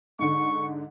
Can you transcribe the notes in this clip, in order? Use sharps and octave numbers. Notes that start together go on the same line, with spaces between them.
G#2 D3 C#6